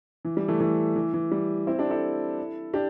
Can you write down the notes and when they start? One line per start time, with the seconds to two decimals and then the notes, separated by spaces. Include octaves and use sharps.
0.25 E3
0.37 G3
0.48 E3 A3
0.60 E3 A3
0.96 E3
1.14 E3
1.31 G3
1.67 C4 E4
1.78 D4 G4
1.90 E4 A4
2.74 D4 G4